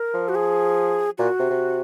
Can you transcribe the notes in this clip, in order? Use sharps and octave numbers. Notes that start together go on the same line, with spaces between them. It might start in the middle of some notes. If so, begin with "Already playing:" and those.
Already playing: A#4
F3
F#4
G#4
A#2 F#4
C3
C3